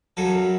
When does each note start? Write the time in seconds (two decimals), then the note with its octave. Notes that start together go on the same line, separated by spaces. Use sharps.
0.17 F#2 C#3 F#3 A4